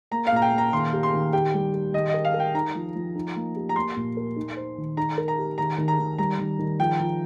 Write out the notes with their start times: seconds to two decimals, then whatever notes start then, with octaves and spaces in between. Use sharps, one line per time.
0.11 A#3 A#5
0.27 F5
0.32 A#2 A#5
0.42 G5
0.53 A#3
0.58 A#5
0.72 D#3 C6
0.93 G4
1.03 C6
1.13 D#3
1.33 G4 G5
1.54 G3
1.73 G4
1.94 D#3 D#5
2.09 A#4 D#5
2.25 F5
2.34 A#4
2.40 G5
2.54 D#4 A#5
2.75 F3
2.96 F3
3.16 D#4
3.36 A#3
3.56 G4
3.69 A#5
3.76 A#3 C6
3.96 A#2
4.17 A#4
4.36 D#4
4.57 C5
4.78 D#3
4.97 D#4 A#5
5.18 A#4
5.28 A#5
5.38 G4
5.58 D#3 A#5
5.78 D#3
5.88 A#5
5.99 D#3
6.18 G3 A#5
6.38 D#3
6.59 D#3
6.79 F3 G5
7.00 F3